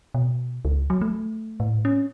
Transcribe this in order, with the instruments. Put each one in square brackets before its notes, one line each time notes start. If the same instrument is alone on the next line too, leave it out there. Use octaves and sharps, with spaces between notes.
[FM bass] B2
C#2
F#3
A3
A2
C#4